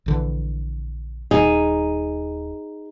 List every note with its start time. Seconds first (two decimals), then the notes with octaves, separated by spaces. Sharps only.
0.06 A#1 D3 E3
1.31 D#1 D#4 G#4